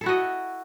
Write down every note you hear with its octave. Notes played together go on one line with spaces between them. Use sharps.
E4 F#4 A4 D#5